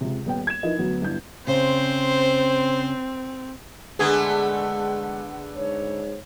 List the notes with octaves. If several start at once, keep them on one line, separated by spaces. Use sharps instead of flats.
C#2 C3
D#1 B3 G5
G#6 E7
F3 D#4 E4 A#4 B4 D#5
D2 F#3 B3
G1 G2 B3 E4 G6
C#3 C4 C5
D3 G#3 A3 B3 G#4 F#5
G#2 C#5